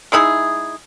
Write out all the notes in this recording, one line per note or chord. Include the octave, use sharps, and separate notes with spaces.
G#3 D#4 E4 G#4